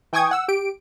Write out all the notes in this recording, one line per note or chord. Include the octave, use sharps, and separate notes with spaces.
E3 G5 G#5 C#6 D#6 G#6
F#5 E6
G4 D7